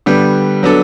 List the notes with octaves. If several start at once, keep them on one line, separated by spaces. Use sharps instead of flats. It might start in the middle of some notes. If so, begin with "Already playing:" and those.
D3 G3 B3
F#3 B3 D4 A4